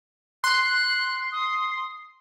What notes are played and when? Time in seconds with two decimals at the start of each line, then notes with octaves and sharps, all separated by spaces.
0.44 C6 F#6
1.32 D#6